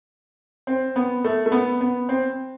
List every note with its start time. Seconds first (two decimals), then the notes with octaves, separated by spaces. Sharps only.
0.67 C4
0.96 B3
1.24 A3
1.46 A3
1.52 B3
1.81 B3
2.09 C4